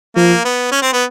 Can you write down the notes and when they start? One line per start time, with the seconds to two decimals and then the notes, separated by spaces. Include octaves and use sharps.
0.16 F3 A#3
0.45 B3
0.72 C#4
0.82 C4
0.93 B3